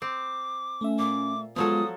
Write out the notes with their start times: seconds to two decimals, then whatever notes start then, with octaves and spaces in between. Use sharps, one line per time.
0.02 C4 D6
0.81 A3 C#4 E5
0.99 A#2 D6
1.56 F3 F#3 G#3 B3 F4 A4 D#6